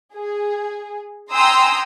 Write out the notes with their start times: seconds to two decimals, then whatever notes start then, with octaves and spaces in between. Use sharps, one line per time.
0.16 G#4
1.33 G5 G#5 A#5 C6 D#6 E6